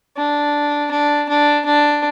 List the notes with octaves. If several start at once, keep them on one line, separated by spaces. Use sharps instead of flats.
D4
D4
D4
D4